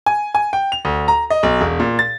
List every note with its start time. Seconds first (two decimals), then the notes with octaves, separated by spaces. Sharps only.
0.06 G#5
0.35 G#5
0.53 G5
0.72 F7
0.85 D2
1.08 A#5
1.30 D#5
1.43 B1
1.61 E1
1.80 A#2
1.99 A6